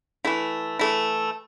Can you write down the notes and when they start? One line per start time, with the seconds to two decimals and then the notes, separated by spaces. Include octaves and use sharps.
0.25 E3 A3 E4
0.79 E3 A3 E4